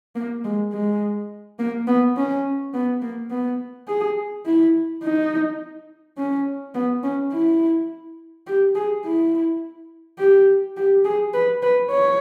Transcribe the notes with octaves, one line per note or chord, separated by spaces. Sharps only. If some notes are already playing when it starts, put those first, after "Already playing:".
A#3
G#3
G#3
A#3
B3
C#4
B3
A#3
B3
G#4
E4
D#4
C#4
B3
C#4
E4
G4
G#4
E4
G4
G4
G#4
B4
B4
C#5